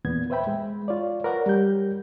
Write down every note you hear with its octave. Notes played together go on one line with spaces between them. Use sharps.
E2 A#2 B3 G#6
B4 C5 E5 G5 B5
G#3
F4 C#5 D5
A#4 B4 C#5 D5 F#5 A#5
G3 G4 G6